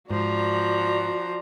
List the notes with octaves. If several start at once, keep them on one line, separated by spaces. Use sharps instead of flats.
G#2 F3 F#4 D5 A#5